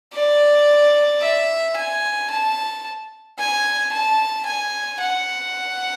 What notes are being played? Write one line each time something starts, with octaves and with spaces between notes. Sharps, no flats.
D5
E5
G#5
A5
G#5
A5
G#5
F#5